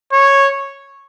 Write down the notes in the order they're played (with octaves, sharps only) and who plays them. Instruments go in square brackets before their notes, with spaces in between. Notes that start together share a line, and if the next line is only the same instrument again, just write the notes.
[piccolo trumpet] C#5